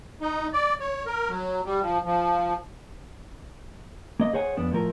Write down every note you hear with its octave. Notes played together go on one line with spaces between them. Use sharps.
D#4
D5
C#5
A#4
F#3
G3
F3
F3
A#3 D#5
G#4 C5 C#5 F#5 G#5
F2 B3 D4
A2 F3 A#4